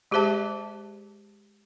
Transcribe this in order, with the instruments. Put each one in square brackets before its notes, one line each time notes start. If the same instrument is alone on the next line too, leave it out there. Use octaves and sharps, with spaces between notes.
[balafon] G#3 G4 G#4 C5 E5 A5